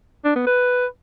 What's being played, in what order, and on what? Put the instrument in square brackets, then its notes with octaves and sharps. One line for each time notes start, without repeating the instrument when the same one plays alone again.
[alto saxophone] D4
B3
B4